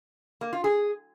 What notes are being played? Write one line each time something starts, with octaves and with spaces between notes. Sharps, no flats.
A#3
F4
G#4